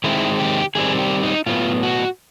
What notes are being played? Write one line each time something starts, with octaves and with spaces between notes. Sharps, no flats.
D#3 G#3 C4 E4
G4
D#3 G3 C4 G#4
G4
D#4
A2 F#3 B3 F4
F#4